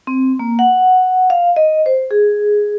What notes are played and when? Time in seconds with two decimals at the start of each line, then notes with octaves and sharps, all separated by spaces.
0.07 C4
0.39 A#3
0.59 F#5
1.30 F5
1.56 D#5
1.86 C5
2.11 G#4